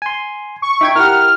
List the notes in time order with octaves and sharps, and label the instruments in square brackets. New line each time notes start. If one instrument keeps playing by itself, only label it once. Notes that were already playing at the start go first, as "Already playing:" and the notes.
[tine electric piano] G#5 C6
[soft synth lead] C#6
[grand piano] D#4 [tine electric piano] E5 G5 G#6
[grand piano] E4 G4 [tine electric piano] A#4 F#5 [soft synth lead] F6